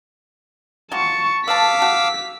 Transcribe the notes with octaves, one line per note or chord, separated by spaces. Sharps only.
F#3 F4 G4 A5 C#6
B4 F5 A5 D6 E6 B6
F#4